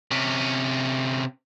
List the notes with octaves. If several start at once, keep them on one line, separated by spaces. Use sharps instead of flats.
C3 C#4